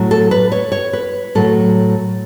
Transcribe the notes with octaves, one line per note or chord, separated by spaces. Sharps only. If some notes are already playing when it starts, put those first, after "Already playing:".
Already playing: A2 F#3 A3
A4
B4
C#5
C#5
B4
A2 F#3 A3 A4